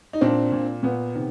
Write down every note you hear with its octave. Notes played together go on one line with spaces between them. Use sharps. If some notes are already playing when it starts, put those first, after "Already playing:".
D#4
A#2 C4 D4
A#2
A#2 B3
C3 D#3